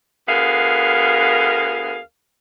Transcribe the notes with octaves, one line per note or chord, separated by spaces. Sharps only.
D2 B3 G#4 A#4 F5